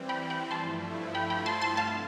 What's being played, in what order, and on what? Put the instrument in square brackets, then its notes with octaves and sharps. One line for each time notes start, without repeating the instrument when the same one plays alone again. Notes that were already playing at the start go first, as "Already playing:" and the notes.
Already playing: [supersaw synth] E3 G3 C4
[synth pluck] G5 B5
G5 B5
[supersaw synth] G2 F3 A3 E4 [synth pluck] A5 C6
[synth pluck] G5 B5
G5 B5
A5 C6
A5 C6
[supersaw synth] C3 [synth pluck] F5 A5